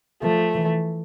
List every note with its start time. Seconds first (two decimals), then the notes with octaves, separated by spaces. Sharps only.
0.22 F3 A3
0.54 E3